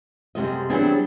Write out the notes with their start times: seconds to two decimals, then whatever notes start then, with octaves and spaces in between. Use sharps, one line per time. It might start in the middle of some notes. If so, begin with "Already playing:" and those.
0.35 F#2 C3 G3 G#3 A4 D#5
0.70 E3 F#3 G3 C4 D4 G#4